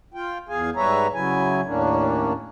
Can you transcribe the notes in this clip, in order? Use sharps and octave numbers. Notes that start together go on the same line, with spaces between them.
F4 G5
E2 G#4 F5 G#5
G#2 G3 B4 C#5 E5 A#5
C#3 F#3 E4 G#5
D#2 A2 A#3 C#4 D4